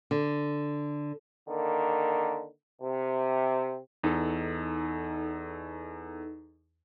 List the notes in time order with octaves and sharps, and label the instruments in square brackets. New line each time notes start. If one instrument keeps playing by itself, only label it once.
[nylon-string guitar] D3
[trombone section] D3 D#3 A#3
C3
[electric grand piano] E2 [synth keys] D#4 A4